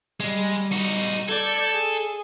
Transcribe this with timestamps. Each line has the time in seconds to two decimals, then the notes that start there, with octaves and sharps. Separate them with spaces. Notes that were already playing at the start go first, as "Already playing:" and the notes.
0.20 G3 G#3
0.72 D#4 F#4
1.29 A4 D5 G6 G#6
1.75 G#4